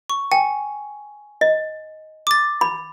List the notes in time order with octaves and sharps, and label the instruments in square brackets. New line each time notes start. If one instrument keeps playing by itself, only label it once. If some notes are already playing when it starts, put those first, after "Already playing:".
[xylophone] C#6
[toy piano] G5 [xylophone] G#5
[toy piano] D#5
[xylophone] D6 A6
[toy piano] B5